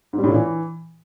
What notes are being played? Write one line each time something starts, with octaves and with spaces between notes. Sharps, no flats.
G#2
G3
A2
A#2
E3